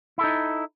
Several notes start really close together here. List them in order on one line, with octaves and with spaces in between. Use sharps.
E4 A4 D#4